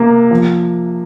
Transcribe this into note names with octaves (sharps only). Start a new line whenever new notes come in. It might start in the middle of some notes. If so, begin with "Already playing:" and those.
Already playing: C3 A#3
F3